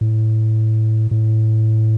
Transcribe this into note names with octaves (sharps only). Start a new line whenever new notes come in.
A2
A2